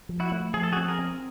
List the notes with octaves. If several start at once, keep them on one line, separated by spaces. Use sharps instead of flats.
F3
E4 F#4
A3
F3 G#4
A4
F#4 G#4
C4
G#4 A#4
C4